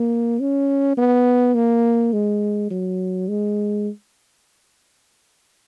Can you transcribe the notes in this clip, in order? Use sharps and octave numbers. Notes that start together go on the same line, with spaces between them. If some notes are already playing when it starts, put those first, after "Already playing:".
Already playing: A#3
C#4
B3
A#3
G#3
F#3
G#3